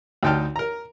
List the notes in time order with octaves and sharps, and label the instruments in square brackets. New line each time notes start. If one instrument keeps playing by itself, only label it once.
[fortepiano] D2 D#4 G5 A5 F6
A#4 A#5